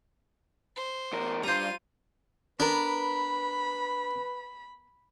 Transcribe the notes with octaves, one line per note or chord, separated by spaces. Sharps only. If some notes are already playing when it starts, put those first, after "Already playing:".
C5
E2 A#4
G2 G3 F4 C5 A#5 D#7
B3 D4 A#4 B4 B5